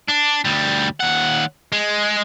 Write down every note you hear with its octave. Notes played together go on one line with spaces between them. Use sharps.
D4
D2 G3
D#2 F#5
G#3